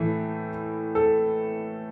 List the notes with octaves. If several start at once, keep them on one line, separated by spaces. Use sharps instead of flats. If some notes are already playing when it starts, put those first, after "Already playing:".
Already playing: A2 E3 A3
A4